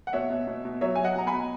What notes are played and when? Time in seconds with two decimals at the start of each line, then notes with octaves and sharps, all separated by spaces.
0.07 F#5
0.13 B2 C#5 E5
0.30 B2
0.47 B2
0.65 B2
0.81 F#3 C#5 E5
0.95 F#3 G#5
1.04 D#5 F#5
1.16 B2 A#5
1.27 G#5 B5
1.33 B2